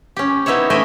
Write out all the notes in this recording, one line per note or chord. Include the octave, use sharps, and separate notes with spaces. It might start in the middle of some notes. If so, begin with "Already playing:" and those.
C#4 G4
B3 D#4 E4 C5 C#5
A3 C#4 D#5 E5 G5 G#5